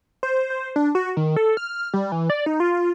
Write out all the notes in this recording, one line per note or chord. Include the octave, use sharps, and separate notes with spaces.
C5
C5
D4
F#4
D#3
A4
F6
G3
E3
D5
D#4
F4